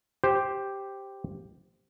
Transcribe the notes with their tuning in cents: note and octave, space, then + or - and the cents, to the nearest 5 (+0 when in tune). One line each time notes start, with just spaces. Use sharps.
G4 +0 C5 +5